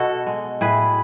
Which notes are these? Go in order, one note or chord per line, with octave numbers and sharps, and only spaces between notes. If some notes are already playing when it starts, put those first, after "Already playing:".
Already playing: B2 F#4 A4
G#3
A2 G#4 B4